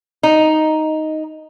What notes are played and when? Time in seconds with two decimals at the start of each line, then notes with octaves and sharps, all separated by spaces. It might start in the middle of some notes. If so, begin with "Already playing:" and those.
0.23 D#4